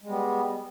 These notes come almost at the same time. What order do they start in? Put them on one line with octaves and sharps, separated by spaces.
G#3 G3 B3